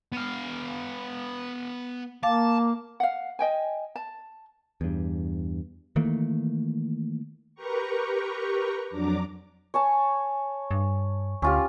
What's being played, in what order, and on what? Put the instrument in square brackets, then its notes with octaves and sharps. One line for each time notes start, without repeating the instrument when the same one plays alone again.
[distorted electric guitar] B3 F5
[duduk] A#3 [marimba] F5 D6 [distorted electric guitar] A5
[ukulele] F5 F#5
D#5 G5 G#5
A5
[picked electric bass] E2 G2
D#3 E3 A3 A#3
[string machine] G4 A#4 B4 G5 A#5 C#6
F2 F#3 D4 A#5 D6
[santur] C#5 G#5 A5
[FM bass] G2
[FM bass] D2 [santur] C#4 F4 G4